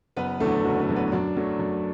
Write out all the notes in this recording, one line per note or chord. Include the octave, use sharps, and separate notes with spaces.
F#1 B3 B4
E2 D3 F#3 A3 A4
F#1 F#4
A3 A4
E2 D3 F#3
B3 B4
F#2 D4 D5
F#3 A3
F#2